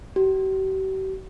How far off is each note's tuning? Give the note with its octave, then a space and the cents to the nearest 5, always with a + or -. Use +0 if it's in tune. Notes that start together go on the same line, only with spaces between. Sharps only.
G4 -45